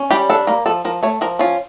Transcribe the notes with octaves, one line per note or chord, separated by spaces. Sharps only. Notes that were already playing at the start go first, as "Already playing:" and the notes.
Already playing: C#4
G3 G4
D4 A4
A#3 A#4
F3 A4
F3 A#4
A3 C#5
F3 A#4
C#4 F4